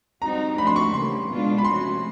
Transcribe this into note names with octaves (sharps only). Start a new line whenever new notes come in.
G3 C4 D#4 F#4 A#5
F3 A3 D4 F#4 B5
C6
C#6
C#3 E3 G3 A#3 C6
B2 G#3 B3 D4 F4
B5
C3 F3 A3 C#4 F#4 C6